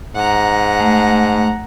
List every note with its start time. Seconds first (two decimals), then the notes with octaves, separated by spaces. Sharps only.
0.16 G#2 F#5 A#5
0.80 A3